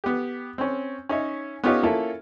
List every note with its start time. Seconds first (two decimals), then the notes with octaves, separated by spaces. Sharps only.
0.04 B3 G4
0.58 C4 C#4
1.09 C#4 D#4 C#5 E5
1.64 B3 C#4 D#4 F4 G4 C#5
1.83 A#3 C#4 E4 F4 A4